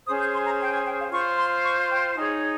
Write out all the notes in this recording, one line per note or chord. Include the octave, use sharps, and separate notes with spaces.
C#4 G#4 C5 D#6
G6
C6
A#5
G5
G#5
G5
F5
F4 C5 C#6
C6
C#6
G5
D#4 G#4 C#5 G#5